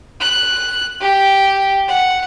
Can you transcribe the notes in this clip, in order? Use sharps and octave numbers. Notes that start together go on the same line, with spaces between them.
F#6
G4
F#5